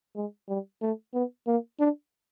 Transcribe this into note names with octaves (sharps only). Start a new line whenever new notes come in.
G#3
G3
A3
B3
A#3
D4